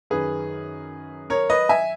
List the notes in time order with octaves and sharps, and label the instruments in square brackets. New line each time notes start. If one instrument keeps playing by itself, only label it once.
[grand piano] F#2 D#3 G#4 B4
A#4 C#5
B4 D#5
E5 G#5